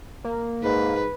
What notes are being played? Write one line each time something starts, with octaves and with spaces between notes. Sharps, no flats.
A#3
G#2 B4